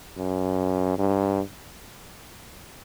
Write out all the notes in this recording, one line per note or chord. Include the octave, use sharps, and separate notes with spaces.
F#2
G2